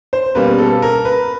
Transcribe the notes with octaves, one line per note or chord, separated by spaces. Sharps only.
C5
B2 G3 A#3 C#4 B4
A4
A#4
B4